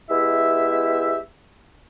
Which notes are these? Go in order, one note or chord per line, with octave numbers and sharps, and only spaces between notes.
G#3 B3 E4 G4 E5